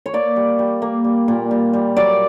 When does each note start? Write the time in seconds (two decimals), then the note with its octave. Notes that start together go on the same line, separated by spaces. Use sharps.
0.06 C#5
0.13 A#3 D5
0.36 G3
0.59 G3
0.82 A#3
1.04 G3
1.28 A#2
1.51 G3
1.73 G3
1.96 F#3 D5